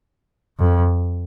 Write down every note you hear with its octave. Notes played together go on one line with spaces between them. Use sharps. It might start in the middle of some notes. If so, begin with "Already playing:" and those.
F2